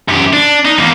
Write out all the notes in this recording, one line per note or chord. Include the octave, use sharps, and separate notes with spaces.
F#2 G4
D4
D#4
E2 A#3